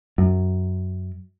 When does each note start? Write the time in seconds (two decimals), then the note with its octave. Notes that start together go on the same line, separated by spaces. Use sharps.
0.18 F#2